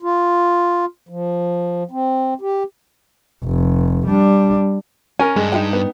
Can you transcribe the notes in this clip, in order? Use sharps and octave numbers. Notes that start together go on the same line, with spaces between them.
F4
F3
C4
G4
F1
G3 D4
C#4 A#4 G#5
G2 G#3
D#4 F4 G5
B3